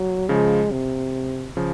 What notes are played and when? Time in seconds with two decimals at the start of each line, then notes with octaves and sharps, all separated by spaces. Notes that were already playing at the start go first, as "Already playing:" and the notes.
Already playing: F#3
0.29 C#3 F3 G#3
0.71 C3
1.57 C#3 F3